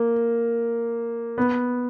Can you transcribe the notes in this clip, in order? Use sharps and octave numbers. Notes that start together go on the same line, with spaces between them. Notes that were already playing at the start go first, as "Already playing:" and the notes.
Already playing: A#3
B3